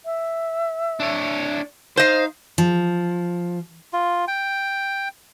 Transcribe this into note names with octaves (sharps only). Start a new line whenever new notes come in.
E5
D4 C#5
D#4 C5 D#5 F5
F3
F4
G5